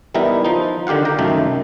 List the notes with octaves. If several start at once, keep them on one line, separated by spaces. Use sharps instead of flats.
E3 G3 B3 D#4 E4 A#4
F3 D#4
D3 D#3 G4 F5 F#5
F5 G5 A#5
C2 F#2 D#3 A3 D#4